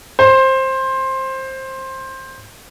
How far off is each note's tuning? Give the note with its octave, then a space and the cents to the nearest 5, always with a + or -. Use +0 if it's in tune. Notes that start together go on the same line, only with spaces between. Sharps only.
C5 +15